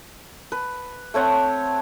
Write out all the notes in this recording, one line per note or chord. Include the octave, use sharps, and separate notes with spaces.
B4
A3 C4 C#5 F#5